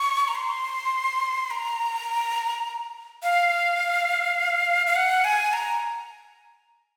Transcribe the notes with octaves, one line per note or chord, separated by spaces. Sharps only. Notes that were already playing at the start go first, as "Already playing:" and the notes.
Already playing: C#6
A#5
C6
A#5
F5
F5
F#5
G#5
A#5